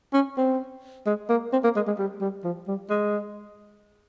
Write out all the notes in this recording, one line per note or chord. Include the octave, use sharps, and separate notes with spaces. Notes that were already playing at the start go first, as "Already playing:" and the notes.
C#4
C4
G#3
A#3
C4
A#3
G#3
G#3
G3
G3
F3
G3
G#3